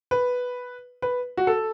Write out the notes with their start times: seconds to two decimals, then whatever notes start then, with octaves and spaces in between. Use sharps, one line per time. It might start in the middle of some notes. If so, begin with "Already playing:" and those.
0.11 B4
1.02 B4
1.37 F#4
1.47 A4